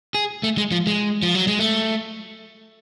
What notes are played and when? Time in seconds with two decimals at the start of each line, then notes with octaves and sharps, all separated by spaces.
0.15 G#4
0.43 A3
0.58 G#3
0.72 F3
0.87 G#3
1.23 F3
1.35 F#3
1.47 G#3
1.59 A3